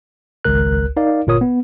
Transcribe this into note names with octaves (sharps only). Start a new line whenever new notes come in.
G#1 C#2 A#4 F#6
D#4 A#4 D5 F5
G1 A#2 F4 A#4 C#5 D#6
B3